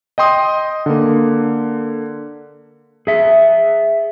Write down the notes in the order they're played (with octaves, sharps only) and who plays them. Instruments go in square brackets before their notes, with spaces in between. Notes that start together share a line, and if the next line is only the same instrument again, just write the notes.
[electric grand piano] D#5 G5 C6 D#6
D3 A#3
[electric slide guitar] G#4 E5